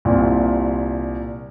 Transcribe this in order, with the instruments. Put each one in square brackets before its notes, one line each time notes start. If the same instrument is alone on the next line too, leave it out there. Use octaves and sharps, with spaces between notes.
[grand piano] C2 A#2